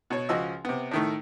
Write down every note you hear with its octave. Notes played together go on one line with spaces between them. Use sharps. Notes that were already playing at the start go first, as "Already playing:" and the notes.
B2 C#5
C#2 F3 F#4 D#5 E6
C3 B3
A2 D#3 A3